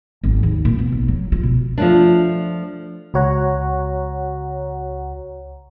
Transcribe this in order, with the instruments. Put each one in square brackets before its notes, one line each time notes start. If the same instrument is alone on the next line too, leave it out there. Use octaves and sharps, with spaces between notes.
[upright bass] G#1
D#2
A#2
B2
B1
F#3
F4
B2
[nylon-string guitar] F3 A3 D4
[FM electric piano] C#2 F#4 C#5 F#5 A#5